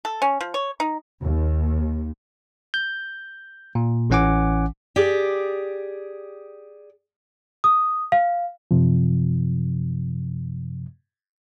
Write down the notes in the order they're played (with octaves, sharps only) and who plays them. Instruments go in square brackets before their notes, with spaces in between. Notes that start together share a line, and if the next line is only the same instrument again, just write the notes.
[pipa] A4
C#4
F3
C#5
D#4
[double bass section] D#2
[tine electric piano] G6
A#2
A1 E3 C#4 F#5 G#5 D6
[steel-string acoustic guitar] G4 G#4 D5
[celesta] D#6
F5
[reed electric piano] F#2 C3 F3